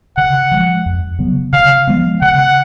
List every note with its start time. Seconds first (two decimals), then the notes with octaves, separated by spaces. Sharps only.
0.17 C#3 F#5
0.51 F3 G#3
0.86 F2
1.19 C#3 F#3 B3
1.53 C#3 F5
1.87 F3 G#3 B3
2.21 C#3 F#5